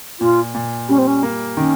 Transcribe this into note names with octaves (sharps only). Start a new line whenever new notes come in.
A#2 F4
A#2
G3 C#4
C4
C#4
A#3
D#3 C#4